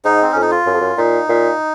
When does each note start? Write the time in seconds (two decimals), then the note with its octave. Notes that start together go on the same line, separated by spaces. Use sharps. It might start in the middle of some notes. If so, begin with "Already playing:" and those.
0.05 G#2 D#4
0.22 C4
0.32 F2 C#4
0.42 D#4
0.51 F4
0.67 F#2
0.74 F2
0.81 F#2
0.98 A#2 D#4
1.29 A#2